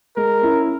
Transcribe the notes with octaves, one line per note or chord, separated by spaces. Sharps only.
G#3 A#4
C#4 E4